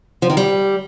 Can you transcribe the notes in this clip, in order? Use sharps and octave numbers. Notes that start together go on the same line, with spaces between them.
F3
D#3
G3